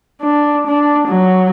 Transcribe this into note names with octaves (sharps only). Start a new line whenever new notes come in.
D4
D4
F#3